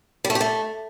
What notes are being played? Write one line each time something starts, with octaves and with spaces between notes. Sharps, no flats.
G3
A3
G4
A3